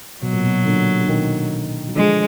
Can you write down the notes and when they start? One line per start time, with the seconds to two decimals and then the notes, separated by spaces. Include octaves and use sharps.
0.22 B2 F#3
0.33 A#2
0.43 B2
0.65 A#2 D3
1.00 D3
1.08 B2 D#3
1.88 F#3
1.95 D3 F3 G#3